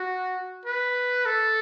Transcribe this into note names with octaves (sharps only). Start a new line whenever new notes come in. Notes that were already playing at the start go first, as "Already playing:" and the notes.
Already playing: F#4
B4
A4